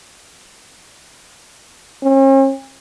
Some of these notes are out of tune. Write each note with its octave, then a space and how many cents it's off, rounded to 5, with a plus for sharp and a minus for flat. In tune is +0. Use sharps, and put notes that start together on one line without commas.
C#4 -45